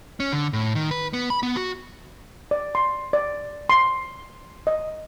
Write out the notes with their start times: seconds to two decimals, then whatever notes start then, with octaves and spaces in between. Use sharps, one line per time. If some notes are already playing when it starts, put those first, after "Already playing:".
0.20 C#4
0.32 D3
0.53 A2
0.75 D#3
0.91 B4
1.13 B3
1.30 B5
1.43 B3
1.57 F#4
2.51 D5
2.75 C6
3.13 D5
3.69 C6
4.67 D#5